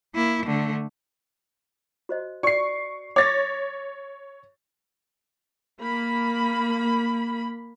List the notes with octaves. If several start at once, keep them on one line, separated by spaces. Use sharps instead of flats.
A#3 E4
D3 A3
F#4 C5 D#5
F#4 D5 C#6 C7
C#5 D6 A6 A#6
A#3 B5